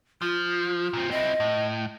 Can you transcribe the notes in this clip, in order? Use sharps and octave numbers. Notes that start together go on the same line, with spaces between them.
F3 F4
A#2 C4
C4 E4 D#5
A2